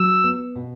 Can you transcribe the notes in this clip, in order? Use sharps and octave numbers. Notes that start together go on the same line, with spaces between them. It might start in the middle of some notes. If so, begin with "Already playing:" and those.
Already playing: F#3 E6
B3
B2